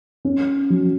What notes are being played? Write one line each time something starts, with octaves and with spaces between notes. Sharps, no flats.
C#4
F#3